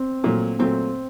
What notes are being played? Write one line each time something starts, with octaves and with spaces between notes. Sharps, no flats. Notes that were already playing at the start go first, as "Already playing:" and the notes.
Already playing: C4
A#2 F#3 A3
A#2 F#3 A3 C4